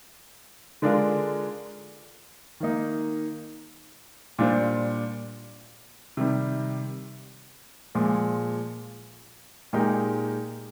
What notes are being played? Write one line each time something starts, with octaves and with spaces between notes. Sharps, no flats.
D3 G#3 D4 F4 A#4
D#3 A#3 D#4
A#2 G3 D4 F4 C5
C3 D#3 G3
A#2 F3 G#3
A#2 G#3 D#4 G4 A#4